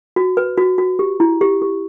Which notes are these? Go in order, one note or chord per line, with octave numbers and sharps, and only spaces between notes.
F#4
B4
F#4
F#4
G4
E4
G4
G4